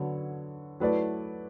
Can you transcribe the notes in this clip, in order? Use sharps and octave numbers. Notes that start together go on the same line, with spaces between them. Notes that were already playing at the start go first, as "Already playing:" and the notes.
Already playing: D3 F#3 B3 F#4 C#5
F#3 A3 E4 B4 D5